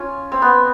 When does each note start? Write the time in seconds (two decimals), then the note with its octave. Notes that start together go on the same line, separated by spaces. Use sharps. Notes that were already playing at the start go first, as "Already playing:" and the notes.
Already playing: C#4 F4
0.32 C4
0.42 B3